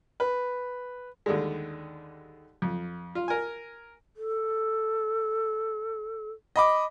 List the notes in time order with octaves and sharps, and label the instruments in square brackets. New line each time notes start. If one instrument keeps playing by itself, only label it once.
[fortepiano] B4
D#2 D3 G3 G#3
F2
F4
A#4 G#5
[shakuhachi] A4
[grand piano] D#5 B5 D6